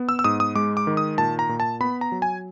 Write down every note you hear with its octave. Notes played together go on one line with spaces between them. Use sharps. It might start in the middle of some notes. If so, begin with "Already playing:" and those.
Already playing: B3
E6
E6
G#2 D#6
D#6
G#3 D6
D6
D#3
D#6
A#2 A5
A#5
A#2
A5
B3 B5
A#5
F#3
G#5